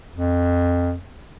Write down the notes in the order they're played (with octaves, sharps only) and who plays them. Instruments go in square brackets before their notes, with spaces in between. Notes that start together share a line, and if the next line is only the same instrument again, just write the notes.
[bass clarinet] F2